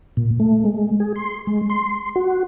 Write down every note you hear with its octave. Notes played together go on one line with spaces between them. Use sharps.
A#2
A3
G#3
G#4
C6
G#3
C6
F#4